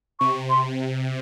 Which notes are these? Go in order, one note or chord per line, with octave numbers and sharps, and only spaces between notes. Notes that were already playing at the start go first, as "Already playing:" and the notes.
C3 C#6
C6